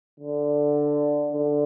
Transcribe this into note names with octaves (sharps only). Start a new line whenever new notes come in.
D3
D3